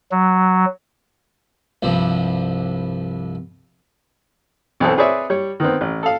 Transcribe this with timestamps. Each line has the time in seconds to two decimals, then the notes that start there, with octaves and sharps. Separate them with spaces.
0.11 F#3
1.83 C2 G2 F3
4.80 B1 E3 B3 C4 A4
4.97 C4 G#4 B4 C#5 D5 E5
5.30 G3 C#5
5.60 D#3 B3 C4
5.81 A1
6.03 A4 F5